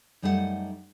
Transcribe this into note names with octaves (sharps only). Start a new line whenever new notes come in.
F#2 G3 A3 D#4 G#4 F#5